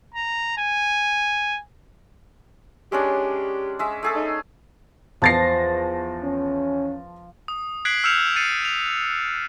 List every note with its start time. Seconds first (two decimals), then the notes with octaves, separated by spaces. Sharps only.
0.14 A#5
0.58 G#5
2.92 G#3 C#4 D4 G4
3.79 G#3 E5
4.03 A3 G#4 A4
4.16 D#4
5.22 E2 F3 A5 A6 A#6 C7
6.23 C#4
7.48 D#6
7.85 F#6 G#6 B6 C7 D7 F#7
8.04 E6 F6 G6 C#7 E7 F7
8.36 A6 C7 C#7 D#7
8.65 F7